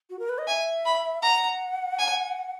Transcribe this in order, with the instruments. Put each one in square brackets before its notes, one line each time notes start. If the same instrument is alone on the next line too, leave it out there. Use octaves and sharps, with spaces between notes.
[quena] F#4
A#4
B4
D#5
[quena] E5 [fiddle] G#5
[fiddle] B5
[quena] F#5 [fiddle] A#5
[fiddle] G#5